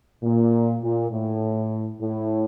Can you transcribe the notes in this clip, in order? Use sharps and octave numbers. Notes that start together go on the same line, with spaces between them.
A#2
A#2
A2
A2